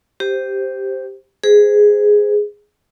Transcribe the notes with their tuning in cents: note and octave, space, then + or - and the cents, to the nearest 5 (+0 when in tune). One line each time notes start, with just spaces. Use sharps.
G4 -5 C5 +0
G#4 +0 C5 -20